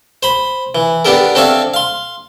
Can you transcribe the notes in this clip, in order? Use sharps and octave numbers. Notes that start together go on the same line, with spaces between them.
C5 B5
E3
B3 D4 G4 A4 A#4
C4 D4 A4 C#5 E5 F5
F5 C6